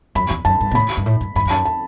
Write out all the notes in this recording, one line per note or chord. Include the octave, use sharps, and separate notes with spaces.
F#2 B5
E2
F#2 A5
G2
B2
A2 B5
G2
A2
G2
G2 B5
E2
F#2 A5
A5